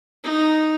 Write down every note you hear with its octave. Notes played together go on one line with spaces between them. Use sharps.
D#4